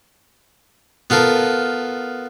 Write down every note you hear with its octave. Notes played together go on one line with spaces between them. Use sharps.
B3 F4 A4 A#4